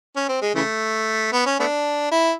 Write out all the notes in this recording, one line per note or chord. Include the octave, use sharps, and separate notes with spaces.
C#4
C4
G#3
C#3 E3 A3
B3
C#4
A3 B3 D4
E4